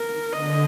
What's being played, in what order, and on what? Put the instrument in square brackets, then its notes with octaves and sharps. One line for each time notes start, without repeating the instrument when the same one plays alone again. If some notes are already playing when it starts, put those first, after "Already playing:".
Already playing: [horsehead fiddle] A#4
[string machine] D3 [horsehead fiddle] D#5